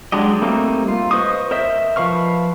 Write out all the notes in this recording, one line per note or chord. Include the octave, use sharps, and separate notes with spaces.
F#3 G#3 D4 G4 D#5
G3 A3 A#3 C4 D#4
F4
B4 C5 D#5 C#6 D#6
A#4 C5 D#5 E5
F3 B4 F5 C#6 F6